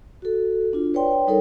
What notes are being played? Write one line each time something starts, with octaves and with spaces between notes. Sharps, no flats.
F#4 A4
D4 F4
B4 C#5 D5 G5 C6
G3 D#4 A4 A#4 C#5 G5